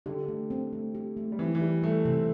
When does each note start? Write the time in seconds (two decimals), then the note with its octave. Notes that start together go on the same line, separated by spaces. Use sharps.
0.06 D3 G4
0.28 A3
0.50 C4
0.73 A3
0.95 G4
1.17 A3
1.32 G3
1.39 E3 C4
1.55 E3
1.61 G3 E4
1.83 G3 A3
2.05 C3 C4